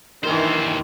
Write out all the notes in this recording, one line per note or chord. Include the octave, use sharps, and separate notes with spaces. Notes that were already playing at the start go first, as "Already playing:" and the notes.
D#2 D#3 E3 D4 C5